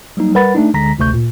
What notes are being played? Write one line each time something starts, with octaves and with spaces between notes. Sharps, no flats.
F#3 G3 A#3 D#4
G3 A#4 B4 F#5 B5 A6
A3 D4 D#4
D2 D3 G#3 A#5 A#6 B6
G#1 D2 C3 A3 C#6 G6
A#2